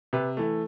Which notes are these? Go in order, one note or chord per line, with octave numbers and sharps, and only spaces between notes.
C3 B4
E3 A3